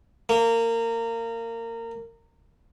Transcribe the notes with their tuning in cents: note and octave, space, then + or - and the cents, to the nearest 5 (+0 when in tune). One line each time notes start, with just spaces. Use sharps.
A#3 -25